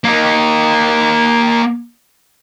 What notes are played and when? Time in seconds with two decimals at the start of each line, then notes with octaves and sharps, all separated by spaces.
0.04 A#3 D#4